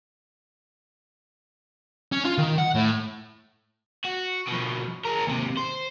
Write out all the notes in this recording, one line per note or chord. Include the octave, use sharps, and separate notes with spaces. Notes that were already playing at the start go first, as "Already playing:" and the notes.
C#4
F4
D#3
F#5
A2
F#4
B2 F3
G#4 A#4
D#2 C3
C5